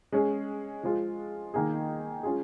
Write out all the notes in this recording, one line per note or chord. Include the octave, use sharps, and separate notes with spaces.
G#3 C#4 G#4
F3 G#3 F4
D#3 A#3 D#4 G#4
G#3 C#4 F4 G#4